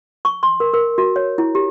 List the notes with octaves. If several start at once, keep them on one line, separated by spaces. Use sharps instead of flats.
C#6
C6
A#4
A#4
F#4
C#5
E4
G4